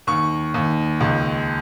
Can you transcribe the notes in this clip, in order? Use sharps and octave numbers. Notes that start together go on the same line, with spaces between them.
D#2 C#6
D#2
C#2